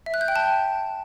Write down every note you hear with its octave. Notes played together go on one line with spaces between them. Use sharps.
E5
F#6
G6
G5
A5